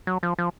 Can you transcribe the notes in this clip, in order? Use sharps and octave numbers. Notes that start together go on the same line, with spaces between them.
F#3
F3
F3